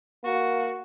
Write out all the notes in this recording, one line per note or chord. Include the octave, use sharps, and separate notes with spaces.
A#3 F#4